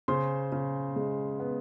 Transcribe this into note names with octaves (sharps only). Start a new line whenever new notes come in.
C#3 C5 C6
C#3
G#3
B3